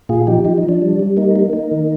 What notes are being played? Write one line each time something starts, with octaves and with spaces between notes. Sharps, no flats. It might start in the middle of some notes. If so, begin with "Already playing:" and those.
A#2 F4 G#4
F3 D#4 G4
F3 D#4 G4
D#4
F3
D4
G3
G3
A#3 D#4
A#3
A#3 D#4
D#3